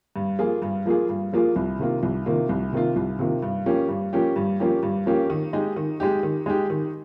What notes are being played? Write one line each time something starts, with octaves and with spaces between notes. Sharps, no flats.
G2
F3 A#3 F4 G#4
G2
F3 A#3 F4 G#4
G2
F3 A#3 F4 G#4
C2
C3 D#3 A#3 F4
C2
C3 D#3 A#3 F4
C2
C3 D#3 A#3 F4
C2
C3 D#3 A#3 F4
G2
F3 A#3 C#4 G4
G2
F3 A#3 C#4 G4
G2
F3 A#3 C#4 G4
G2
F3 A#3 C#4 G4
D#3
G#3 D#4 G4
D#3
G#3 D#4 G4
D#3
G#3 D#4 G4
D#3